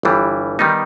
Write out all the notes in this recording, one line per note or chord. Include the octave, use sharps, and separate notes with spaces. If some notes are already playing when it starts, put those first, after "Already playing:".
G1 G2 E3 G3
D#3 G3 B3 D#4